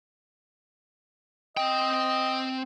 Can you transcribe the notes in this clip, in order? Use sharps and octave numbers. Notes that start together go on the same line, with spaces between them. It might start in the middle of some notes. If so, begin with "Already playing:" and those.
C4 D#5 G5